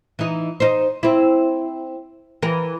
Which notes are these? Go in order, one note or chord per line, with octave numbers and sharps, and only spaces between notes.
E3 D#4
D#4 C5
C4 E4
E3 A#4